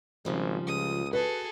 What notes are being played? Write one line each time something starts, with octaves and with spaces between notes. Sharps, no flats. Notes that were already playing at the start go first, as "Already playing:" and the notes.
G#1 C#3 F3 G3
C#2 D#6
F#4 G#4 A4 B4